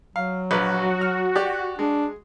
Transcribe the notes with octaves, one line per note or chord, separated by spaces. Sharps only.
F#3 F5
A#1 F#4 B4
F6
G4 D5
G#3 D4